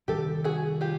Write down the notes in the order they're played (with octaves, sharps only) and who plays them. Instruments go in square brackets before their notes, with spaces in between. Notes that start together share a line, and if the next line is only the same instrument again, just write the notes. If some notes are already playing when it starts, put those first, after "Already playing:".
[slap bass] C3 D#3 G3 C4 [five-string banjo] G4 A4
[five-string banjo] F#4 G#4
F4 G4